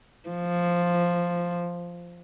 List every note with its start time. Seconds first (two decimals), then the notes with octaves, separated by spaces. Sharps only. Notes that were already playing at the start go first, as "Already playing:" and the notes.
0.29 F3